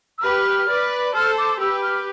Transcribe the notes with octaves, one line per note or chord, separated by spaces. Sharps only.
E6
G4 B4 F6
B4 D5
A4 C5 F6
D6
G4 B4 E6
F6